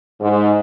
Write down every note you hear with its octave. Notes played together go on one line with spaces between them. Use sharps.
G#2